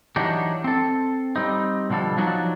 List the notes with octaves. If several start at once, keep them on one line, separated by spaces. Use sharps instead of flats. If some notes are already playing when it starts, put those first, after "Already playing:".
E3 F#3 D4 D#4 G4
C4 A4
G3 C4 D#4
B2 D3 F3 G3 A4
F3 F#3 D4 D#4 F#4